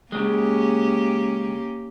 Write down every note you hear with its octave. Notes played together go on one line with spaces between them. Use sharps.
C#3 G#3 A#3 C#4 G4